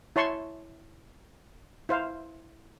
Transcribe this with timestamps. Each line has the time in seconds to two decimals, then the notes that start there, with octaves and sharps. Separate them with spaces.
0.16 E4 C#5 A5 C6 C#6
1.89 E4 C5 F5